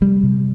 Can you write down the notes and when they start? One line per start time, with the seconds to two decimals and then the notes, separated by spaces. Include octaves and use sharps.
0.01 C3 G3
0.23 C3